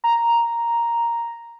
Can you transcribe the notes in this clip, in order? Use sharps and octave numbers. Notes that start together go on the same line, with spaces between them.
A#5